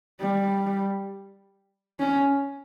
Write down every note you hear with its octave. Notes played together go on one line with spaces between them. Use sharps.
G3
C#4